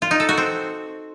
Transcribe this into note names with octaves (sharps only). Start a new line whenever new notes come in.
F4
D#4
A4
F#4
C4